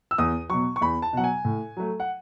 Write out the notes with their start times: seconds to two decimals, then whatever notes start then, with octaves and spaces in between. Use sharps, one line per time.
0.11 E6
0.18 E2 D#6
0.50 B2 F#3 C#6
0.76 C#6
0.81 E2 B5
1.02 A5
1.13 B2 F#3 F#5
1.24 G#5
1.45 A2
1.77 F#3 A3
2.00 F#5